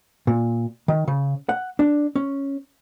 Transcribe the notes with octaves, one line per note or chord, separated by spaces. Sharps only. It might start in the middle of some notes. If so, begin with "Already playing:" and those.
A#2
D#3
C#3
F#5
D4
C#4